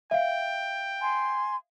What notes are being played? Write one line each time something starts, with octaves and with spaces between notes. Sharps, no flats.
E5 F5 G5
G#5 C6